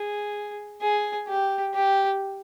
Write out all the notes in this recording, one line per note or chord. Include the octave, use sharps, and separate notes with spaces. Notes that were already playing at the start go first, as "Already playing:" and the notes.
Already playing: G#4
G#4
G4
G4